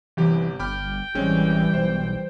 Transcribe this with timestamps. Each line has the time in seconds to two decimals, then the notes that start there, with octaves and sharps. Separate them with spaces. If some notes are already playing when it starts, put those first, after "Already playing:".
0.17 G1 C3 E3 G4
0.60 G1 G5 B5 D6 F6
1.15 A1 E3 G3 G#3 C4 C#4
1.74 B1 C5